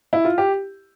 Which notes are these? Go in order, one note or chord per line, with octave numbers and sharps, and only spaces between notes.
E4
F4
G4